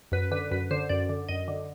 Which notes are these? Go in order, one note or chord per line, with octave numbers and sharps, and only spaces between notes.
F#2 B4
D3 B4
F#2 B4
D3 C5
F#2 D5
D3
F#2 D#5
D3